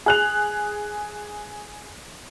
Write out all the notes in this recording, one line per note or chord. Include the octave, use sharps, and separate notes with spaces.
G#4 F#6 F7